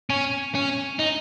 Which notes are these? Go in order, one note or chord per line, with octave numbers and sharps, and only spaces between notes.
C#4
C#4
D#4